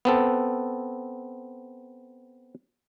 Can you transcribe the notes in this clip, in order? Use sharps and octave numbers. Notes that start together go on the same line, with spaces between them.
B3 C4 A4